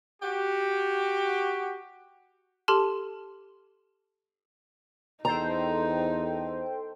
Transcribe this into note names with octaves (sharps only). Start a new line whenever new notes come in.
F#4 G4
G4 A4 A5 C6 F6
E2 D#4 A4 C5 G5 A#5